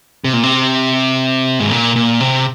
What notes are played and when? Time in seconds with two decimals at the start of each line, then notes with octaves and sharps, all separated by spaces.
0.24 C3
0.33 A#2
0.43 C3
1.60 G#2
1.71 A#2
1.96 A#2
2.20 C3